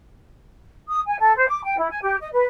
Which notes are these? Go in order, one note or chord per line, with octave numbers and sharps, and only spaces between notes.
D#6
G#5
A4
C5
D6
G5
E4
G#5
G4
D#5
B4